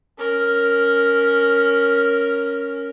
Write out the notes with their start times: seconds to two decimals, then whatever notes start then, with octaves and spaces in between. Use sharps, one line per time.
0.18 C#4 A#4